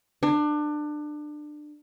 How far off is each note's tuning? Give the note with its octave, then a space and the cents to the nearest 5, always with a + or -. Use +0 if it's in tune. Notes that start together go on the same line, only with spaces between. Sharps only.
D4 +25